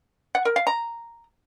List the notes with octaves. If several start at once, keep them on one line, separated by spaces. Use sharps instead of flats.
F#5
A#4
F5
A#5